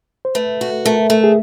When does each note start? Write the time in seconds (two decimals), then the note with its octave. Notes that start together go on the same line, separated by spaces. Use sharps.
0.25 C5
0.35 A3 B4
0.61 F#4
0.85 A3 A#4
1.10 A3
1.24 G#4